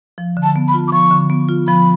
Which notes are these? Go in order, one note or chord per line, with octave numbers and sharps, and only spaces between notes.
F3
D3
A5
B3
B5
F4
D6
F3 C#6
D3
B3
F4
F3 B5